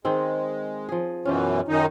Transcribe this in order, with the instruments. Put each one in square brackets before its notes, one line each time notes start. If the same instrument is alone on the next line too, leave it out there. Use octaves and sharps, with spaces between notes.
[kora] D#3 C4 G#4 [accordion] G#3
[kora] F3 G#4
[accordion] F#2 B2 E3 [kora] C#4 F4 G4
[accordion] F#2 D#3 D#4